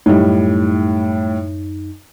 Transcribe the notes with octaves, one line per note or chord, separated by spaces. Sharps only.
F#2 A2 G3 D#4